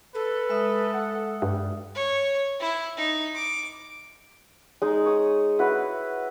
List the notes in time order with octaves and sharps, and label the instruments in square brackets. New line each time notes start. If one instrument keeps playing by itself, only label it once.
[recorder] A4 [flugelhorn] B4
[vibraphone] G#3 E5 D#6
[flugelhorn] F#5
[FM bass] G2 [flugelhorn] G3
[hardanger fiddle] C#5
E4
D#4
D6
[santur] G#3 D#4
C#5 D#6
E4 F#4 B4